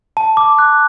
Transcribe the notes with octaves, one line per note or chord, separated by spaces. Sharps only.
A5
D6
F#6